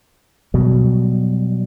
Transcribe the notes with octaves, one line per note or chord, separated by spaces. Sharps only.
B2 F#3 G3